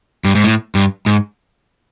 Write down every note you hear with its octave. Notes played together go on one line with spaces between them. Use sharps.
G2
G#2
A2
G2
G#2